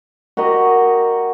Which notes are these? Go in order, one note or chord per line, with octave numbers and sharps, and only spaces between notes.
F#4 G4 A#4 D#5